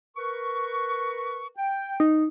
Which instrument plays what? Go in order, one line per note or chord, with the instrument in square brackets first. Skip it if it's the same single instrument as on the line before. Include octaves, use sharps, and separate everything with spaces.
[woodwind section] A#4 B4 C#6
G5
[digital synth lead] D#4